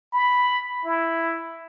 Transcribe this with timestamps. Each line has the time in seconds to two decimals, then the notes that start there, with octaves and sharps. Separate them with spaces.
0.13 B5
0.85 E4